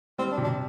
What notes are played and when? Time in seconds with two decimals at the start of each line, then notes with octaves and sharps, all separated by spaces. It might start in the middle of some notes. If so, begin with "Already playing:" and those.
0.19 G3 C4
0.32 D4
0.38 C3
0.44 D4